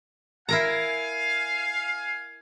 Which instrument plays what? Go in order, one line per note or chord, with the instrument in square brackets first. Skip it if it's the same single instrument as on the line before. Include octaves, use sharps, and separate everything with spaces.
[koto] E4 A#4 A#5 [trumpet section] F5 G#5